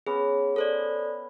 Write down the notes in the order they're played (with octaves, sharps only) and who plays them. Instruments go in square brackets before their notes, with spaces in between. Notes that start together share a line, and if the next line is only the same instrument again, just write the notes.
[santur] B3 C#4 [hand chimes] G#4
[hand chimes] A4 C5 D5